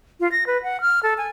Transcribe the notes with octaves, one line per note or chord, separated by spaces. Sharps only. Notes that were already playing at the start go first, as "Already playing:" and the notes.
F4
A#6
B4
F#5
F6
A4
G#5